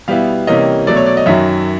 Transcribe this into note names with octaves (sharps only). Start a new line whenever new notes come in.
B2 G3 B3 E4 F5
C3 E3 G3 A#3 C#4 D#5
B2 F#3 A3 D5
C#5
D5
D#5
F#2 D#3 F#3 E5